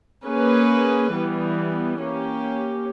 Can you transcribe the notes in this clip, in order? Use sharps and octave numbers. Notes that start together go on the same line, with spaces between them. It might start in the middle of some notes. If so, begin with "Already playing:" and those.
A#3 C#4 G#4 B4
E3 G3 B3
A#3 C#4 G4